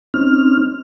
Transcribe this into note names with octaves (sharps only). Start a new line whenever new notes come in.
C4 C#4 D#4 F6